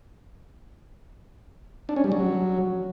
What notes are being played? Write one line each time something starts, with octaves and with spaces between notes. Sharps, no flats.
D4
C#4
G3
F#3